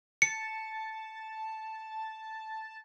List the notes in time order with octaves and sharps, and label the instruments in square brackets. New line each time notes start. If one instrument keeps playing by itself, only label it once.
[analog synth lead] A5 [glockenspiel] C#7